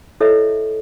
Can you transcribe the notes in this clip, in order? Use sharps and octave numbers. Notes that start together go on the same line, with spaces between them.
E4 A4 C#5 D#5 E5